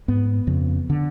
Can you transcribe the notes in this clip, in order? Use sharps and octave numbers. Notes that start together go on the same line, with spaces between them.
G#2 B3
F2 C#3
D3